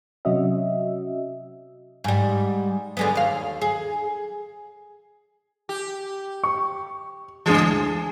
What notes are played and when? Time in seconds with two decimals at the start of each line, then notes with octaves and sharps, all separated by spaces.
0.25 C3 F#3 C#4 F#4 D#5 E5
2.04 G#2 G3
2.97 D3 G#3 B3
3.15 D#2 F5
3.61 G#4
5.69 G4
6.43 C#6
7.46 D2 E3 G#3 G#4